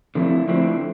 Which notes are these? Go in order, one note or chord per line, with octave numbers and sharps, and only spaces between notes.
D3 F3 A3 C4 E4
D3 F3 A3 C4 E4